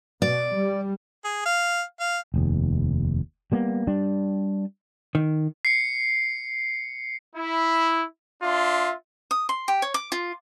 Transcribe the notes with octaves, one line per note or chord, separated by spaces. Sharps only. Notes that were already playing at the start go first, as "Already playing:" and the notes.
B2 D5
G3
G#4
F5
F5
F1 D#2
G3 A#3 B3
G3 D4
D#3
C7 C#7
E4
D4 F4 E5 C6
D#6
C6
G4
C#5
D6
F4